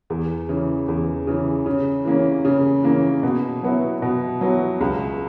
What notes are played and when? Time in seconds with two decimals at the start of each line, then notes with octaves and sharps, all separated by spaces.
0.10 E2
0.49 C#3 E3
0.88 E2
1.27 C#3 E3
1.66 C#3
2.05 E3 A#3 C#4
2.45 C#3
2.83 E3 A#3 C#4
3.23 B2
3.63 F#3 B3 E4
4.02 B2
4.41 F#3 B3 E4
4.81 C#2